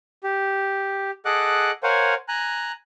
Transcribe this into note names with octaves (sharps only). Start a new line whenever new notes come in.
G4
G#4 A4 D#5 F#5 D6 F#6
A#4 C5 C#5 F5 F#5 G#5
G#5 A#5 F#6